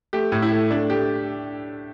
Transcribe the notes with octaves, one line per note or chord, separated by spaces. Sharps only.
A3 G4
A2
E4
A3
A3 D4
A3 G4